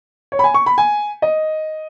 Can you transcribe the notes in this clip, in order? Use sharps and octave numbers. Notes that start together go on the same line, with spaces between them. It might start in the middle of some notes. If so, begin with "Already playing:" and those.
C#5
B5
G#5
C#6
B5
G#5
D#5